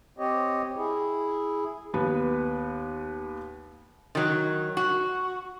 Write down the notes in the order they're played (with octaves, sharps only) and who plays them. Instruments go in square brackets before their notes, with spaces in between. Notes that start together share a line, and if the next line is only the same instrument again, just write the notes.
[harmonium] C4 G4 C#5 D#5
E4 G#4
[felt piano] D#2 B3 B4
[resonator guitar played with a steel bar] D#3 F#3
F#4